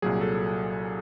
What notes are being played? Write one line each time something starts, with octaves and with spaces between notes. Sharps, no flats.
C2 A#2 F#3 G#4
A4